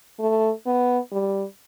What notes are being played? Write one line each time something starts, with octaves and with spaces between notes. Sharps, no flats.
A3
B3
G3